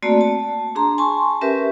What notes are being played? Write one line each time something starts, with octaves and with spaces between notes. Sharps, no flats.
A3 A#3 C4 F#4 D5 A5
A5
D4 G#4 A#5 C6
G#5 A5 C6 C#6
C#4 G4 A#4 B4 E5